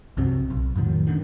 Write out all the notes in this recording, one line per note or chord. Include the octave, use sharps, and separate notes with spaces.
C2 F#2 C3 F#3
B1
F2 A2 D#3 F#3
G#1 F#2 D3 D#3